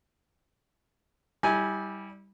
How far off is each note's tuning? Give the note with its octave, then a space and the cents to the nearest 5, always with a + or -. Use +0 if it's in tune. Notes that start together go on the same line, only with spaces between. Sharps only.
G3 +0 E4 -35 G#5 +0